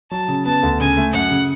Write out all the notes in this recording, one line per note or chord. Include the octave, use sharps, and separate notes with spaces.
F#3 A5
C#3
B3 A5
D2
C#3 G#5
A3
F#2 F#5
C#3